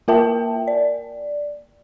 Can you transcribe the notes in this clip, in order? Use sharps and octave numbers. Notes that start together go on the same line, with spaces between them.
A#3 F4 A#4 E5 G5 A5
D5